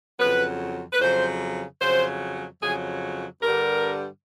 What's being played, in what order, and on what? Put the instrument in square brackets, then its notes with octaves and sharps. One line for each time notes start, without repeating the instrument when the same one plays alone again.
[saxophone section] F2 C#3 F#3 B4
B4
F2 C#3 F#3 C5
F2 C#3 F#3 C5
F2 C#3 F#3 G#4
G2 D3 G3 A#4